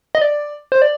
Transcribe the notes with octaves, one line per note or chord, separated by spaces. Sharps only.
D#5
D5
C5
D5